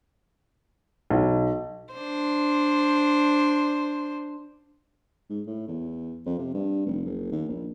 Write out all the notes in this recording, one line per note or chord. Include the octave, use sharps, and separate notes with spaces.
B1
D4 C5
G#2
A2
E2
F2
C3
G2
F1
F#1
D#2
A#1